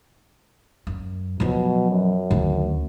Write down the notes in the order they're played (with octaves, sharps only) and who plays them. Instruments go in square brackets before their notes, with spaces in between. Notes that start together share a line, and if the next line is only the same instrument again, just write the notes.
[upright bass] F#2
[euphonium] B2 [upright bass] F3 F#3
[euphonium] F#2
[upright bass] D2 D#3